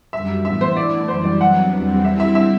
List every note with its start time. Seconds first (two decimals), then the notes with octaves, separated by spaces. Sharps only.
0.13 F#2 D3 G3 E5
0.45 A2 E3 B3 E5
0.61 C5
0.77 D3 A3 E4 D5
1.08 F#2 E3 G3 C5
1.24 D5
1.40 C3 F#3 B3 D4 F#5
1.72 E2 D3 G3 C4
2.04 D3 G3 C4 E4 E5
2.20 E5
2.35 E5